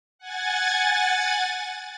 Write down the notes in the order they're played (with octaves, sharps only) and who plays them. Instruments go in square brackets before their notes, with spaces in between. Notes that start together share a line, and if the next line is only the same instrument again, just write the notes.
[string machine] F#5 G#5 G#6 A6